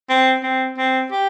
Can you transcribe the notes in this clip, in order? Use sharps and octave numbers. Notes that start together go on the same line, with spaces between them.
C4
C4
C4
G4